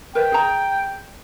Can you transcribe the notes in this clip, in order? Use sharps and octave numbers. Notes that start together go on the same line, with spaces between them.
A#4 B4 E5 G5
G#4 A#5